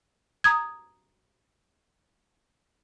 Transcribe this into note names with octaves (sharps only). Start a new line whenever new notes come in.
A#5 D#6 G#6